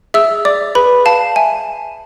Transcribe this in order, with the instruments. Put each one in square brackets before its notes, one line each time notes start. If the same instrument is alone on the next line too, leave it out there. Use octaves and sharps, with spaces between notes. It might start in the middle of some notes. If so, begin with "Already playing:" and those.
[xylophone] G#4 E5 E6
D5 D6
G#4 B4 B5
F5 A5
E5 G#5